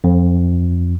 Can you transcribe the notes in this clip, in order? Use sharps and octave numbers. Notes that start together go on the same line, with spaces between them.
F2